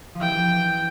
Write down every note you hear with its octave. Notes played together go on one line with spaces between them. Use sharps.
F3
E3 G5